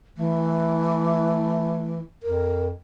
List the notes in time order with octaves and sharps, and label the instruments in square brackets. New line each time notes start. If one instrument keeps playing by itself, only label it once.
[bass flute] E3 [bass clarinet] A3
[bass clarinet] F2 [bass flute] A#4